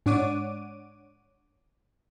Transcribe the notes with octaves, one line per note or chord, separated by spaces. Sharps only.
G#2 D4 C#5 F#5 D6 D#7